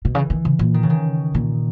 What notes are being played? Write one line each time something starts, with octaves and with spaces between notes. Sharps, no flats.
B2
C#3 E3
D#3
C#3
A#2
D#3
C#3
D#3
A#2